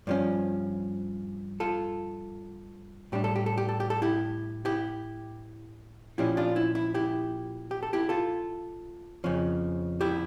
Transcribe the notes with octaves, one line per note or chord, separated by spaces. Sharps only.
G2 F3 C#4
F4 A4
A2 G3 D4 G4
A4
G4
A4
G4
A4
G4
A4
E4 G4
E4 G4
A#2 F3 C#4 E4 G4
D4 F4
E4
E4
E4 G4
G4
A4
E4 G4
F4 A4
F2 C#3 F3 C#4
E4 G4